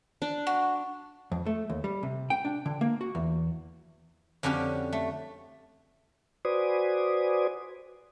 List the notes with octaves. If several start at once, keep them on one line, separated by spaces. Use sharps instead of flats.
D4
F#4
F2
A3
D#2
G3
C3
G5
D4
D3
A#3
F#4
E2
F2 D3 C#4 F#4 G4
A3
F#4 B4 C5 D5 G#5 D#6